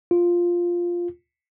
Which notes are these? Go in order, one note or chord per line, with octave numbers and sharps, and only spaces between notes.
F4